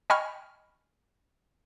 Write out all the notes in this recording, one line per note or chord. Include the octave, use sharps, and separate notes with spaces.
D#5 G5 G#5 B5 C#6 F6